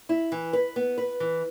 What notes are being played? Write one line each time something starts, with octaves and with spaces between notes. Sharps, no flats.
E4
E3
B4
B3
B4
E3